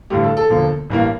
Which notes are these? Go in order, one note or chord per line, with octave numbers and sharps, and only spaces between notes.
A1 G2 D3 A3 G4
A4
A4
E1 D2 D3 F3 A#3
A1 G2 E3 A#3